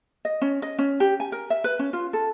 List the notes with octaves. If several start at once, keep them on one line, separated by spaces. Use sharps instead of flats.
D#5
C#4
D#5
C#4
G4
G#5
A#4
E5
B4
C#4
F4
A4